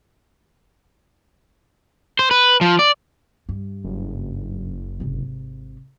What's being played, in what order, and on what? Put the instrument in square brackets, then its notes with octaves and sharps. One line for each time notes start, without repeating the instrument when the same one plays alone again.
[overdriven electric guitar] C5
B4
F3
D5
[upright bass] G2
[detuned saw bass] F#1
[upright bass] G#1 C3